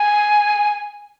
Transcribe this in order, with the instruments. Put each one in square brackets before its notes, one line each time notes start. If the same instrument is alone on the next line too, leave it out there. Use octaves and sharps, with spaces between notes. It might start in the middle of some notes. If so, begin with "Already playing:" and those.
Already playing: [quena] G#5